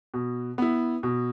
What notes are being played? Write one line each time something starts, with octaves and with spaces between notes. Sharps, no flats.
B2
B3 E4
B2